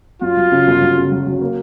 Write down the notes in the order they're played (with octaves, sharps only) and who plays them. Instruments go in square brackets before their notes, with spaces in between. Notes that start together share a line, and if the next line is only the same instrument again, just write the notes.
[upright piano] F#2 [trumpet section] F4
[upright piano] F#3
C#3
G1
F#3
C#3
F#3
F#3
A#3